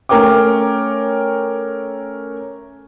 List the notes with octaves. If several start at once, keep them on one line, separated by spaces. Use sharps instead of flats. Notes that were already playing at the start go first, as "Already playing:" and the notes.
A3 C#4 A#4 C#5 G5 D6